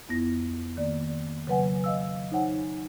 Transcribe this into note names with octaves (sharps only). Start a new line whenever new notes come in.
F2 B3 E4 A#6
D#3 A#3 D5
C#3 F#3 B4 F#5 G#5
D#5 F5 E6
D#4 C5 C#5 F#5 G#5